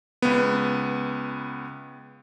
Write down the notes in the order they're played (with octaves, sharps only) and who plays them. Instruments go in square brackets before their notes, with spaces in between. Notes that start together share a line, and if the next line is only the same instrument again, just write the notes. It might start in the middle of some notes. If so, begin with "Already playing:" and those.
[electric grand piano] C#2 B3